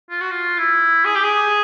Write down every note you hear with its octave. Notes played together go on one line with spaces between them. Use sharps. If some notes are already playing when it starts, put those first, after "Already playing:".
F4
F#4
F4
E4
G#4
G4
G#4